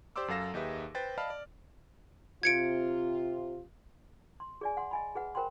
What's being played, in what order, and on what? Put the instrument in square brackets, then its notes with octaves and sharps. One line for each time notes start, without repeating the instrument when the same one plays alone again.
[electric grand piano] G4 C5 D5 C6 D6 E6
F#2 F#3 A4 F5 A#6 E7
D#2 D#4 G4 G#4 B4 E5
B4 C5 G5 A6
D5 D#5 F5 A5 B5 F6
D5
[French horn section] C3 F4 [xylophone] G#6 C#7 D7
[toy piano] C6
G#4 D5 G#5
F#5 C6
D#5 G#5 B5
G#4 B4 F#5
A#4 C5 G5 B5 C6